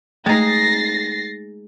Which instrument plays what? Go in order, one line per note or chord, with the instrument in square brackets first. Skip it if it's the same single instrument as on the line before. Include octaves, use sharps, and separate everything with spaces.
[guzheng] G#3 D#4 [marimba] A3 [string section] A6 A#6 C7